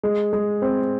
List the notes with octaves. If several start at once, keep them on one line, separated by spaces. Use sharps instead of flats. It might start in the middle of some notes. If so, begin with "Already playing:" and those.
G#3
G#3
C4